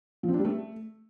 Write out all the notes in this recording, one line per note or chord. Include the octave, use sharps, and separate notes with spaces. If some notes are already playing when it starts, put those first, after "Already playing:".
F3
C4
D4
G3
A3